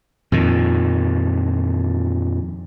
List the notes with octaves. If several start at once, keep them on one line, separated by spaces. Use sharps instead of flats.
F2 A#2 D#3